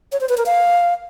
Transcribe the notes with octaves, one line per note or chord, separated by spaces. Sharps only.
C#5
C5
B4
A#4
F5